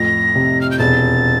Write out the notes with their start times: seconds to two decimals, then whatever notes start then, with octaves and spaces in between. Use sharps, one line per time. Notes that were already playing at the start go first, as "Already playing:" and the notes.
Already playing: F2 A2 A#6
0.36 C3
0.61 F6
0.71 G6
0.79 E1 A6